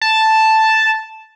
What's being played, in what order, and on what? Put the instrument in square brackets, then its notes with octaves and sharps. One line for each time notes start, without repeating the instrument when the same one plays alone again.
[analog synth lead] A5